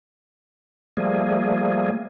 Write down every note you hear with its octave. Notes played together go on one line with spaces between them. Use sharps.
F3 G3 A3 A#3 G#4